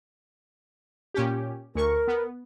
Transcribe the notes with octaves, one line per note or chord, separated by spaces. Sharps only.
A#2 C#4 G4
D2 A#4 C#6
B3